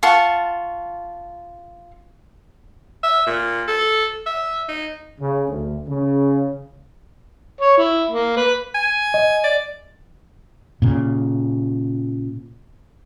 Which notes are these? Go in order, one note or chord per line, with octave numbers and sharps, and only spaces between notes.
F4 F#5 A5 C#6
E5
A#2
A4
E5
D#4
C#3
D2
C#3
C#5
E4
A#3
B4
G#5
D#5
D5
A#2 C#3